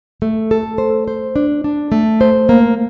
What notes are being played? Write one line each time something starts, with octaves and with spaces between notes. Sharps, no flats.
A3
A4
C5
C5
D4
D4
A3
C5
A#3